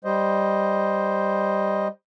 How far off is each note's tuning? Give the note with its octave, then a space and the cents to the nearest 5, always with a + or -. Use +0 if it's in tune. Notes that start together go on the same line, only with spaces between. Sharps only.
G3 +0 C5 +5 D#5 +0